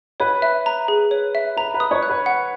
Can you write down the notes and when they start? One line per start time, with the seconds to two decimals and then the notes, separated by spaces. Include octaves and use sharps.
0.20 B4 C#5
0.42 E5
0.66 A#5
0.88 G#4
1.11 C#5
1.35 E5
1.57 B4 A#5
1.74 B4
1.80 D#6
1.91 C#5
2.03 F#6
2.09 B4
2.26 F#5